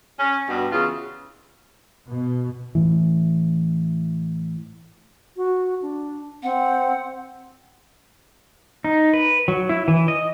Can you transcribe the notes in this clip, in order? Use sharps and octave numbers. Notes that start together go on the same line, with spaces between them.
C#4
G2 B2
E2 C#3 F4
B2
A2 E3
F#4
D4
C4 F#5
D#4
B4
F#3
E4
E3
D#5